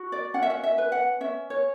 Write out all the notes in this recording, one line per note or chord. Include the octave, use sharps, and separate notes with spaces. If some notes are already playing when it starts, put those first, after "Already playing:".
Already playing: F#4
D5
C#4 F#5
E5
F#5
E5
B4
F#5
C#4 E5
C#5